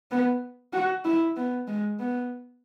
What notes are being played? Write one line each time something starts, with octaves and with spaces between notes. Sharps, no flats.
B3
F#4
E4
B3
G#3
B3